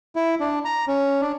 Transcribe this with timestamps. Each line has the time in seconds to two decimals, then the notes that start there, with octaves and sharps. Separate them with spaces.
0.16 E4
0.40 D4
0.65 A#5
0.88 C#4
1.21 D4